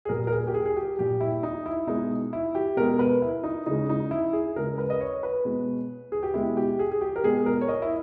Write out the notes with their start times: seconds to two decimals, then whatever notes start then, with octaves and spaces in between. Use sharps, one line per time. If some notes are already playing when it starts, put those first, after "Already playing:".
0.05 G#4
0.09 A#2 G3 A#4
0.27 A#4
0.32 G#4
0.47 G4
0.54 G#4
0.66 G#4
0.77 G4
0.98 A#2 G3 G4
1.21 E4
1.43 D#4
1.66 E4
1.87 B2 G#3 D#4
2.33 E4
2.55 G4
2.77 B2 G#3 A#4
2.99 B4
3.22 E4
3.44 D#4
3.66 C#3 G#3 D#4
3.89 D#4
4.11 E4
4.33 G#4
4.56 C#3 G#3 A#4
4.78 B4
4.90 D#5
5.01 C#5
5.23 B4
5.45 B2 G#3
6.12 G#4
6.23 G4
6.34 B2 G#3 E4
6.57 G4
6.79 G#4
6.92 G#4
7.01 G4
7.16 A#4
7.24 B2 G#3 G#4
7.46 A#4
7.61 C#5
7.68 D#5
7.82 E4